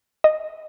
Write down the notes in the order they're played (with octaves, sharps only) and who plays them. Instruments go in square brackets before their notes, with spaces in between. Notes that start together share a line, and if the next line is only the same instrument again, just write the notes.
[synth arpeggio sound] D#5